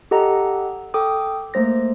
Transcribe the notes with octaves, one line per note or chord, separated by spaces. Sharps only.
G4 A4 D#5 F#5 A#5
A4 G5 D6 D#6
A3 A#3 C5 A#6